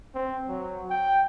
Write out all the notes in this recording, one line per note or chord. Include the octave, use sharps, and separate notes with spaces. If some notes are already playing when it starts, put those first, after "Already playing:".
C4
F#3
G5